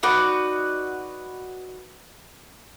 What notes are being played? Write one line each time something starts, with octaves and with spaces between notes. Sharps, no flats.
D#4 F#4 B4 D5